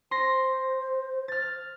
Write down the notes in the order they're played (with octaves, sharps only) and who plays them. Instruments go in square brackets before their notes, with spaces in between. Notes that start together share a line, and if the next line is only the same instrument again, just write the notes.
[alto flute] C5 [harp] C6 A#6
[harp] F6 A6